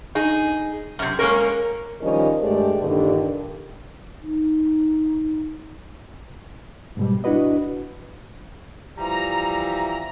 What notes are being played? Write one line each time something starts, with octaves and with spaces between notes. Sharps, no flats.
D#4 G#4
F#2 C3
G#3 A#3 C#4 A#4
D#3 F3 G3 C#4 A#4 D#5
G2 G#3 A3 G4 D5
G2 A#2 D3 D#3 G3
D#4
G#2 B2 G3
D4 E4 F#4 B4 D#5
E3 F3 G3 A#5